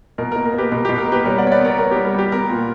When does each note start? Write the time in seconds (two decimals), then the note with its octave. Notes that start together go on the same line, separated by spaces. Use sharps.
0.18 B2 A#4
0.32 A#4
0.36 A#3
0.45 A#4
0.54 A#3 G4 B4
0.72 B2 A#4
0.85 B2 G4
0.98 A#4
1.07 A#3 G4 B4
1.25 G3 A#4 C#5
1.38 D5 F#5
1.43 B3 C#5
1.52 B4 D5
1.60 B3 A#4 C#5
1.78 B3 A#4
1.91 G4
1.96 G3
2.05 A#4
2.14 G3 G4
2.32 B3 A#4
2.50 A#2